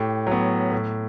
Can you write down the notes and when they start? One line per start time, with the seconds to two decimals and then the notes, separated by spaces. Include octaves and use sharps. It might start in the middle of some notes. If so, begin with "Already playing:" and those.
Already playing: A2 G4
0.27 F#3 B3
0.71 A2